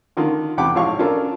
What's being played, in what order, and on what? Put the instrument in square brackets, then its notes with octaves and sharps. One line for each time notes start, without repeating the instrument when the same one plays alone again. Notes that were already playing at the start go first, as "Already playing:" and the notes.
[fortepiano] D3 D#3 F4
E2 C3 F#5 G5 B5 D6
G#1 A2 F3 F5 C#6
C#4 D4 F4 A4 A#4